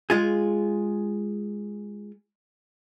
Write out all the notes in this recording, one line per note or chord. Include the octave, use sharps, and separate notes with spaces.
G#3 F4 G#4